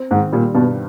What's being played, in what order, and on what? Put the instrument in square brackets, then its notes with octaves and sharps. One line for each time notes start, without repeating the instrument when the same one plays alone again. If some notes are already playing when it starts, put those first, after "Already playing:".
Already playing: [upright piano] C4
[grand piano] G#2 [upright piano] D#3
[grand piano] A#2 [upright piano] G3
[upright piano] G2 [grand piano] B2